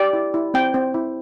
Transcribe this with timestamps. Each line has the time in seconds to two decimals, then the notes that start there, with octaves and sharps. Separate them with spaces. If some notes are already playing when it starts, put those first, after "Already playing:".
Already playing: G4 D5
0.13 E4
0.34 E4
0.54 C4 G5
0.74 C4
0.94 E4